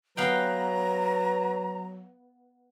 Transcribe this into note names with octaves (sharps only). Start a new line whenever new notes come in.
F#3 B3 B4 F5 G5 A#5